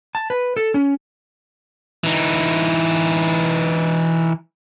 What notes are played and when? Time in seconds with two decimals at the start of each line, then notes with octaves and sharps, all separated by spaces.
0.15 A5
0.30 B4
0.57 A4
0.74 C#4
2.04 E3 D#4